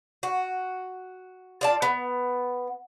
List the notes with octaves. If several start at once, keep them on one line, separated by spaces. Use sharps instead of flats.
F#4
F4 D5 A5
B3